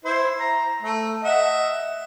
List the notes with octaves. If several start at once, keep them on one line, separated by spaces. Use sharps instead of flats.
E4 C5
A#5
A3
D#5 E5 F#5